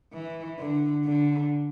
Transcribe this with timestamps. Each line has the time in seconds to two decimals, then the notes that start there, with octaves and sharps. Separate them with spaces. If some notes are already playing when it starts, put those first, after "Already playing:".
0.13 E3
0.59 D3
1.05 D3